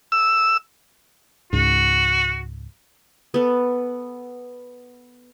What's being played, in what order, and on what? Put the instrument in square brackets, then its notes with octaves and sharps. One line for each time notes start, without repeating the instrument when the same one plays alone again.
[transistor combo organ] E6
[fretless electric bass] C#2 G#2 [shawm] F#4
[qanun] B3 A4